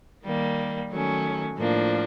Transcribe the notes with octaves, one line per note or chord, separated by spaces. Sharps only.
D#3 G3 A#3
D#3 F#3 A3 C#4
A2 F3 A#3 D4